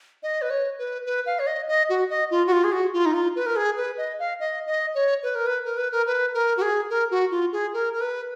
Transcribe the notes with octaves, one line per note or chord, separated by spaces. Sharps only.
D#5
B4
C#5
B4
B4
F5
C#5
D#5
D#5
F#4
D#5
F4
F#4
F4
G#4
F#4
F4
D#4
F4
B4
A#4
G#4
B4
D#5
F5
D#5
D#5
C#5
B4
A#4
B4
A#4
B4
A#4
B4
A#4
F#4
G#4
A#4
F#4
F4
G#4
A#4
A#4
B4